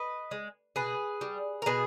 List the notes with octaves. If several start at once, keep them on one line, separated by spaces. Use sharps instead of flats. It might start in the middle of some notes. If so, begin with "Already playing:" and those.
Already playing: B4 D#5
G#3
B2 G#4 B4
G3
A#4
B2 G#4 B4